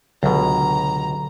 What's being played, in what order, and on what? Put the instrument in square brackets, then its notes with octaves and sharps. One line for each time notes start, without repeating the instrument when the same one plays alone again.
[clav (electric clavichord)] C#2 B2 [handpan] D3 F#3 A4 [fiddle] A#5